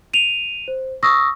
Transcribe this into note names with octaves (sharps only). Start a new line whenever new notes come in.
D#7 F7
C5
C#6 D#6 E6 A#6